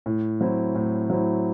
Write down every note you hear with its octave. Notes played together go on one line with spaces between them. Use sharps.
A2
F#3 C4 E4
A2
F#3 C4 E4